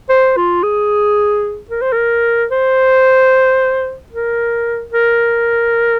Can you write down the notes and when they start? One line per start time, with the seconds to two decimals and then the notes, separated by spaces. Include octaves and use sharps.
0.09 C5
0.36 F4
0.63 G#4
1.70 A#4
1.81 C5
1.92 A#4
2.51 C5
4.12 A#4
4.92 A#4